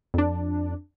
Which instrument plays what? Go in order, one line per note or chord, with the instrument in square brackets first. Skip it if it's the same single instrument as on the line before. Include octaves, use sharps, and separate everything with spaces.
[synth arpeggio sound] F2 D4